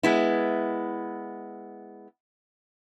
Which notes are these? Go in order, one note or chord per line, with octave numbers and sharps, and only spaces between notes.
G#3 B3 E4